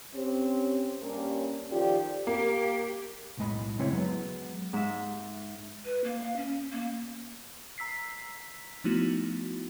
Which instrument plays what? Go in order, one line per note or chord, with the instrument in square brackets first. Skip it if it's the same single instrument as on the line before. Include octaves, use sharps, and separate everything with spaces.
[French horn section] C4 C#4 G4
G2 G3 A#3 C#4
D#3 F3 F4 G4 A4 D5
[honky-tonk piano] A#3 [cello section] G4
[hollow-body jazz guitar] B1 F#2 A2 G#3 D#5 B5
C#3 G#3 C4 E4 C#5
F#3 G#3 B3
[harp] G#2 E5
[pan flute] B4
A#3
F5
C#4
A#3
[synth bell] A#5 E6 B6 C7
F3 A3 B3 D#4 E4 F#4